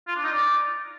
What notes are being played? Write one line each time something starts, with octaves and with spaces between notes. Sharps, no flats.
F4
D4
D#4
D5